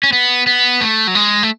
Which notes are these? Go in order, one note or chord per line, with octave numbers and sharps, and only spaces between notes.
C#4
B3
B3
A3
F#3
G#3
A3